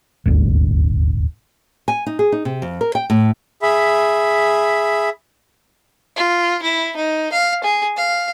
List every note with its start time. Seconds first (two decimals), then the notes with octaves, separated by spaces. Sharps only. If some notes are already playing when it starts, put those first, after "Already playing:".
0.26 D#1 G#1 D2 D3
1.88 G#5
2.06 D#4
2.19 G#4
2.32 D#4
2.45 C3
2.62 F2
2.81 A#4
2.95 G5
3.10 A2
3.62 G#4 E5 B5
6.16 F4
6.63 E4
6.96 D#4
7.32 F5
7.64 G#4
7.97 F5